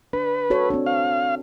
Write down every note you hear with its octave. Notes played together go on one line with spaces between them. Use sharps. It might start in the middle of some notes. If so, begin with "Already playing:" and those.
D4 B4
F#4 A4 C#5
C4 D4
F5